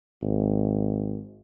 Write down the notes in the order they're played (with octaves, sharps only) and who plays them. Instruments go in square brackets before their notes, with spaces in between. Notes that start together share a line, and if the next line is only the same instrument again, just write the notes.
[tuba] G#1